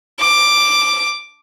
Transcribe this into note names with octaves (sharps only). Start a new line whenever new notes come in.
D6